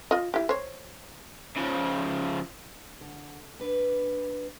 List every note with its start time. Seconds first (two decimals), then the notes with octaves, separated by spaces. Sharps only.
0.11 F4 D#5
0.34 E4 G4
0.49 C5 C#5
1.57 C#3 F3
3.01 D3
3.60 D4 B4